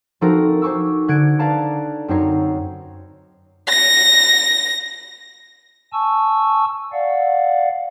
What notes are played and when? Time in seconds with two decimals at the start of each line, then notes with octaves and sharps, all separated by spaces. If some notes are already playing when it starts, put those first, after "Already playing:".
0.21 F3 C4 D#4 F#4 A4 A#4
0.62 C5 G#5 C#6 D6 E6
1.08 D3 F#6 G#6 C#7 D7
1.39 B4 D5 F5 A5 A#5
2.08 F#2 C4 D#4 C#5 C7
3.69 A#6
5.93 G#5 A5 C#6 E6
6.92 D5 F5 F#5